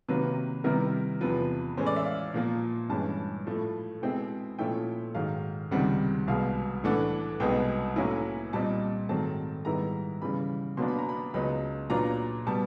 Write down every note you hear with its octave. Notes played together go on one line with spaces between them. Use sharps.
C3 D#3 F#3 A#3 B4
C3 D#3 G3 B3 E4 A#4
E2 C3 F3 B4
A2 E3 G#3 C#4 C5
D5
E5
F5
A#2 F3 A#3
G2 E3 G#3 C#4 A5
A2 F3 A3
B2 G#3 C4 E4 G5
A#2 F3 A3 C#4 E4 G5
G#2 D#3 F#3 F5
C#2 C3 D#3 G3 C4 F#5
C2 B2 G#3 F5
A2 E3 A3 D4 F#5
C2 B2 G#3 B3 D#4 G5
A2 F#3 A#3 C#4 E4 G#5
A#2 G3 C4 D#4 A5
G#2 D#3 F#3 A3 C4 A5
G#2 D#3 G3 B3 E4 A#5
C#3 E3 G3 B5
B2 F#3 A#3 D4 C6
B5
A#5
B5
C#2 C#3 F#3 B3 D#4 B5
A#2 F#3 B3 D4 F4 A#5
B2 G3 A5